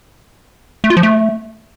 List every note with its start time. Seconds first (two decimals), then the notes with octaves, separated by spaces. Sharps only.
0.84 A3
0.90 F4
0.97 F3
1.03 A3